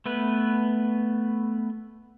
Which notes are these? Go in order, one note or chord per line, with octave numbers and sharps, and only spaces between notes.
A3 B3 B4